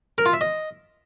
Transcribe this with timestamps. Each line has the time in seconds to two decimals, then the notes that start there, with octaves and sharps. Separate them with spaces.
0.18 A#4
0.26 F4
0.33 E5
0.41 D#5